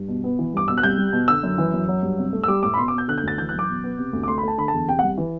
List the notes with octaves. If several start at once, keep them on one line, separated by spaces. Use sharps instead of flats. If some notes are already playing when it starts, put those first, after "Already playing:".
Already playing: G2
B2
B3
E3
G2 D6
B2 E6
F#6
C2 G6
G3
B2
D3 E6
F#2
E3
F#2
F#3
G2
C3
A3
E6
G3 D6
A2 D6
B5
B2 C6
D6
B3
G6
D3 F#6
G6
D2 A6
E3 G6
F#6
F#2
D6
B2
B3
C3
D2
D6
A3 C6
B5
A3 A5
D3 B5
A5
E2
C3 G5
C2 F#5
E3